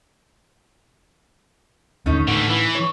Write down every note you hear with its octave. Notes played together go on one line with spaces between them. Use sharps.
D#2 G#2 D3 A3 C#4 D#4
A2 D3 E3
E3
C#5